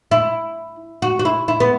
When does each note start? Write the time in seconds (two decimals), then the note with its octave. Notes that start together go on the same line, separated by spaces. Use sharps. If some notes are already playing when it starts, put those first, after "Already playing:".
0.11 E4
1.02 F#4
1.19 F#4
1.25 E4
1.48 E4
1.60 B3